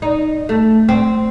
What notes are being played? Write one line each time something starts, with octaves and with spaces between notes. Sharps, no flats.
D#4
A3
C4